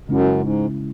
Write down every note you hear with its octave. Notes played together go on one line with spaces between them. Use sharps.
F#2 C#3 G#3 C#4 E4
G#2